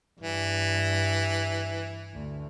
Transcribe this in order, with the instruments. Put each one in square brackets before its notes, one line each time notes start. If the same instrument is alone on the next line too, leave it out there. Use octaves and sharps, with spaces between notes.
[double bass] G2 [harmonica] E3
[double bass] D2